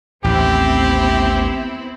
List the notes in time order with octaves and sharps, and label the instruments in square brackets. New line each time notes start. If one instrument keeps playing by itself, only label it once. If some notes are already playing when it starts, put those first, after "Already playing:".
[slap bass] A1 D#2 A2 [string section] B3 C4 E4 [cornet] G4